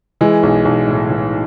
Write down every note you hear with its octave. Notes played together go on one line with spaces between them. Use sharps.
E3 G#3
B1
B1
A2
E3